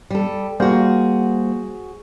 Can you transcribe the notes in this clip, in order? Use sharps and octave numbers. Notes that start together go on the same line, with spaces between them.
G3 A4
G3 A#3 F#4 G#4 C5